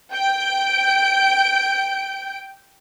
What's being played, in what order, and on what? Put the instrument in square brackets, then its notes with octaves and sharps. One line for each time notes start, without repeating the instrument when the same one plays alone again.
[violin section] G5 G6 D7